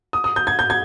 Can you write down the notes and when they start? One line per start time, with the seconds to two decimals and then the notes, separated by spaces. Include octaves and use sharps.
0.13 D#6
0.24 D#6
0.36 G6
0.47 G#6
0.59 G6
0.70 G#6